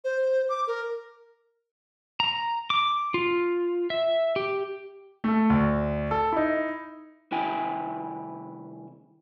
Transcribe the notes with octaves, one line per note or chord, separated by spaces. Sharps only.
C5
D6
A#4
A#5
D6
F4
E5
G4
A3 A4
D2
A4
D#4 E4
C2 D#3 E4 G5 G#5